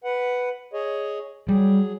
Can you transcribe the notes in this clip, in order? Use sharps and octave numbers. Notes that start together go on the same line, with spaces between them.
B4 F#5
G#4 C#5 D#5
F#3 G3 G#4